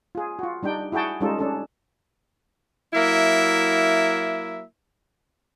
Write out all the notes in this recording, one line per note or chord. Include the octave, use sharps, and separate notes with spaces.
F4 G#4
F4 F#4
G3 D4 D#4 G5
E4 F#4 G#4 G5 A5
G3 G#3 C#4 D#4 F4 A4
C#4 D4 A4
F#3 A#3 E4 E5